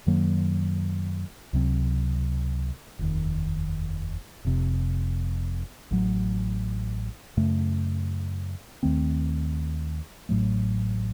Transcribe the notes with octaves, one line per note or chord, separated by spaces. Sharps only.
F#2 D#3 F#3 A#3
C#2 C3 F#3 C4
F1 D#2 D#3
F1 F2 C3
A1 A2 F#3
F#2 C#3 A3
D#2 D#3 A3 C4
A1 A2 F#3 A3